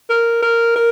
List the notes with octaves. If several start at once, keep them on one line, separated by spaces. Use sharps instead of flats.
A#4
A#4
A#4